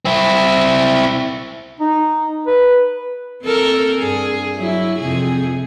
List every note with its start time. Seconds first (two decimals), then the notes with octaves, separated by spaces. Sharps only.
0.05 C4 E4
1.80 D#4
2.47 B4
3.43 C4 A4 A#4
3.99 G2 G#4
4.56 F#3 E4
4.99 F2 C3 G#4